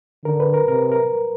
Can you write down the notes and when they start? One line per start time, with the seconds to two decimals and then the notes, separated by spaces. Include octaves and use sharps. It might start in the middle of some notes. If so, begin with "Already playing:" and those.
0.24 D3 A#4
0.40 B4
0.54 A#4
0.68 C3 A#4
0.91 A#4